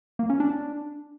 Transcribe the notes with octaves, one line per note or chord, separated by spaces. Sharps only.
A#3
C#4
D4